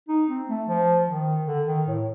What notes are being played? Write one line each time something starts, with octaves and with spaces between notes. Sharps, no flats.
D#4
C4
A3
F3
D#3
D3
D#3
A2